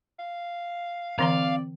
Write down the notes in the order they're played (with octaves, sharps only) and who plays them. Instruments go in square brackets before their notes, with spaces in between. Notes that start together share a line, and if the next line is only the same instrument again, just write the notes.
[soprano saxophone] F5
[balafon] D3 E3 A#5 [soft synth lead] C4 [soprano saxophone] D5 [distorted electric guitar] F5